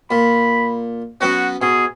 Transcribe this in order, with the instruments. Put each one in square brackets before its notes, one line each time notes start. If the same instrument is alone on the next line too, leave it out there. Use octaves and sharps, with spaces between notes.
[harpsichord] A#2 [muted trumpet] B5
[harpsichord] F#3 B3 C#4 [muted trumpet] F#4
[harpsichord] B2 [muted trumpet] G#4